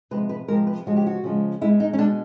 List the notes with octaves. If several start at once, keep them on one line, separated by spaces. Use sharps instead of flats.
C3 F3 G#3 B4
B4
C3 F3 G#3 A#4
B4
C#3 F3 G#3 F#4
G4
F#4
C#3 F3 G#3
B2 G#3 E4
D#4
C#4
B2 G#3 D4